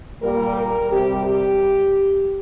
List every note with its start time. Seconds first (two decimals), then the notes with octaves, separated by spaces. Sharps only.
0.22 A#2 G3 A#4
0.56 A#4
0.91 C3 G3 G4
1.26 G4